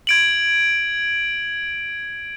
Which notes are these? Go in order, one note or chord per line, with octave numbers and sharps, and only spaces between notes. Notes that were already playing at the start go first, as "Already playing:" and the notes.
G#6 D7 F#7